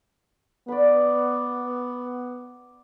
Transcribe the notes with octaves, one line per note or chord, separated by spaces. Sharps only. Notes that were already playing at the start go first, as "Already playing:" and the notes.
B3 D5 B5